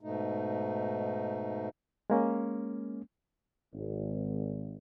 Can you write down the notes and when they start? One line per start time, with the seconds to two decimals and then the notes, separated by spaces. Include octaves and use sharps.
0.01 G#2 B2 A3 D#4
2.10 G#3 A#3 C#4
3.74 G#1